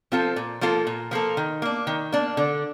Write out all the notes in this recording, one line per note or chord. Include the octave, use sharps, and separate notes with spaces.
F3 C4 F4 A4
A#2
F3 A#3 F4 A4
A#2
F3 A#3 F4 A4
D#3
A#3 D4
D#3
A#3 D4
D3